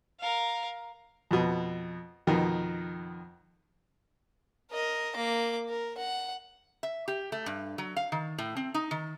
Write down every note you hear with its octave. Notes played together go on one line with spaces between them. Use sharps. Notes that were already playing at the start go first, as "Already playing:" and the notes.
A#4 F5
F2 B2
F2 B2 D#3
A#4 D#5
A#3 D6
A#4
F#5
E5
G4
A3
G2
F#3
F5
D#3
A2
C4
D#4
D#3